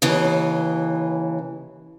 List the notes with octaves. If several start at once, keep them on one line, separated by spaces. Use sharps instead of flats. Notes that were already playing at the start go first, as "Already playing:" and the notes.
D#2 C#3 E3